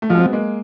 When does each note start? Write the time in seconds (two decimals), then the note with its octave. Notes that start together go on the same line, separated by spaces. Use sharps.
0.02 A3
0.09 F3 F#3 G#3
0.17 C4
0.25 B3
0.32 G#3 A#3